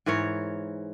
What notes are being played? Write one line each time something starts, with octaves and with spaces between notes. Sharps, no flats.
G#2 E3 A#4 C#5